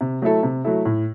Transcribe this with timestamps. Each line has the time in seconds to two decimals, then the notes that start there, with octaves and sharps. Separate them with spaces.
0.01 C3
0.22 F#3 A3 E4 A4
0.43 C3
0.64 F#3 A3 E4 A4
0.85 A2